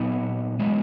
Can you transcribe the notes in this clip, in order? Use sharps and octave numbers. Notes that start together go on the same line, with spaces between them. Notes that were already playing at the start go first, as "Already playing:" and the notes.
Already playing: A#2 F#3 B3 D#4
F#3 G#3 B3